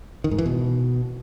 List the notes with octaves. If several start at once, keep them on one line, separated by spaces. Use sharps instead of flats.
D#3
G#2
E3
B2